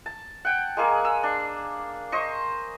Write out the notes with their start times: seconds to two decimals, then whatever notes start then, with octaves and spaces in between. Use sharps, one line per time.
0.06 A5
0.45 F#5 G5
0.77 G#3 A#3 G#4
1.05 E6
1.23 D4
2.12 C5 D#5 C#6